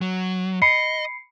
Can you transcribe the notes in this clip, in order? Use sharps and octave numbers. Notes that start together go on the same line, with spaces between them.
F#3
D#5 B5 C7 C#7